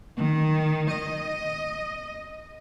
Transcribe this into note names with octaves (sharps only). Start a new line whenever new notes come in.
D#3
D#5